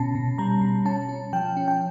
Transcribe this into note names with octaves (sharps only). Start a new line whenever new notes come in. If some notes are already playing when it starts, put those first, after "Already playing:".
Already playing: B2 C#4 A5
B2
G3 A#5
B2
C#4 A5
C#4
F3 G5
C#4
G5